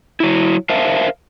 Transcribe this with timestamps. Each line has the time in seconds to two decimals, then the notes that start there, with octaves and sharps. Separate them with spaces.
0.20 F#3 E4
0.70 A#4 C5 E5 F5 A5